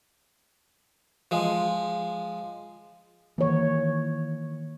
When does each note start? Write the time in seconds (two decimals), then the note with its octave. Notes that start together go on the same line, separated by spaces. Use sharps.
1.31 F3 G#3
3.38 D#3 E3 A#3 C#5